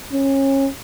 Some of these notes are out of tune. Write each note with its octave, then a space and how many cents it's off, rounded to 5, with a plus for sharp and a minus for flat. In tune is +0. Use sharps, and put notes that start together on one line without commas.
C#4 -25